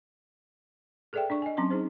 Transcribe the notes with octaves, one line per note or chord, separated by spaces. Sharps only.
G#4 A4 B4 D5 E5 G5
D4 D5 C#6
D#5 G#5
F#3 C4 C#4 A#5 C6
D#4 G#4 C5